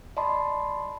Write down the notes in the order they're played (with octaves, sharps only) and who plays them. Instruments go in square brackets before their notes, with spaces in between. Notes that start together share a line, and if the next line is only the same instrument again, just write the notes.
[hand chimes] D5 D#5 A5 B5 C6